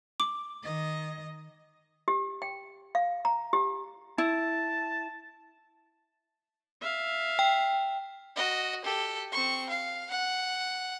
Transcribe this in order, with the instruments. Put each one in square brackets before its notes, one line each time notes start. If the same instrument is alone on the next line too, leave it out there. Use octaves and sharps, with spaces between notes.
[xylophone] D6
[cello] D#3 D#5
[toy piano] G4
G5
F5
A#5
G4
[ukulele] E4 [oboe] A5
[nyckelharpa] E5 F5
[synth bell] G5
[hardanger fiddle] F#4 D#5
G4 A4
C4 C#6
F5
F#5